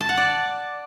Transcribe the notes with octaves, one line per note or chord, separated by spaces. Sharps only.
A5
F#5
D5